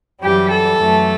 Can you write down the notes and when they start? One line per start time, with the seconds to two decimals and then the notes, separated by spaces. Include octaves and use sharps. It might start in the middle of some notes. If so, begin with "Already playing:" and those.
0.22 F#2 E3 G3 G4
0.51 A4
0.80 F#2 E3 A3